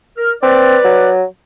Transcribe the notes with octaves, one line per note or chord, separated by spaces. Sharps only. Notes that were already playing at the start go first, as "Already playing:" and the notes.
A#4 F6
C4 B4 D5
F#3